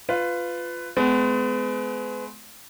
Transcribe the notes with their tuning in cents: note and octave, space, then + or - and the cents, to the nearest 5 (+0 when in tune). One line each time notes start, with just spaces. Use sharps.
F4 +0 B4 +15
G#3 +35 B3 +40